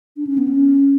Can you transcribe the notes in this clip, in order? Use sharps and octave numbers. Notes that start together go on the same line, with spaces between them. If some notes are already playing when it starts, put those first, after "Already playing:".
D4
C#4
B3
C#4